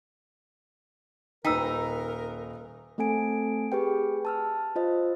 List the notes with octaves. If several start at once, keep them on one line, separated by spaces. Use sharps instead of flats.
D#1 D#4 A#4 B4 G5 A#5 E6 B6
A3 C4 A4 G#5 D7
G4 G#4 B4 G5
A5 E6 F6
F4 C5 D#5